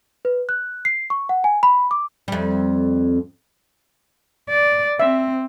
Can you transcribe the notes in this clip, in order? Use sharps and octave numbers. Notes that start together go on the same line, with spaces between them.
B4
F#6
C7
C#6
F#5
G#5
B5
D6
F2 G3
D5
C4 E5